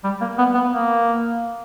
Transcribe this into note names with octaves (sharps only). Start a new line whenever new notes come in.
G3
A#3
B3
B3
A#3